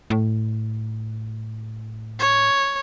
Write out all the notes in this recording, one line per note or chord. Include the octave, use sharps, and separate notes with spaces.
A2
C#5